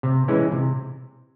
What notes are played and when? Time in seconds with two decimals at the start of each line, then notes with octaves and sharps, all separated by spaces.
0.03 C3
0.28 E3 G#3 C#4 E4
0.52 C3